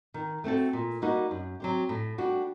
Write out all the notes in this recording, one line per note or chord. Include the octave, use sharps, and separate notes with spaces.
D#3
A3 C4 F#4 A4
A#2
G3 A#3 D#4 F#4
F#2
F#3 C4 G4
A2
G3 D4 F#4